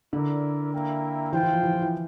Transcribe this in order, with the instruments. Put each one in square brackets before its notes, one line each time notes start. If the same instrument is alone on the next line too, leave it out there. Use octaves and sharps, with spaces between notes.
[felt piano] D3 [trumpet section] E4 A#4 D5
[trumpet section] A#3 E4 A#4 E5 G5
[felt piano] E3 [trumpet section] F4 C5 G5
[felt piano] E3
F3
E3
F3
E3